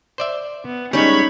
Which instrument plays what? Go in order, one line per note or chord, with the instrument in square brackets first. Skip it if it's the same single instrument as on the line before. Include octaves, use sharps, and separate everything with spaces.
[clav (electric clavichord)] C5 D5 E5
[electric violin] B3
[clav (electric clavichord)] G3 G#3 [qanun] C#4 D#4 [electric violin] C#5 B5